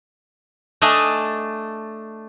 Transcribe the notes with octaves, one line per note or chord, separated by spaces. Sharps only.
A3 D4 D#5 G#5